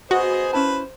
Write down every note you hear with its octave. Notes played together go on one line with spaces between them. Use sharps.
B3 F#4 G#4 C5 D#5
C#4 E4 B4 A5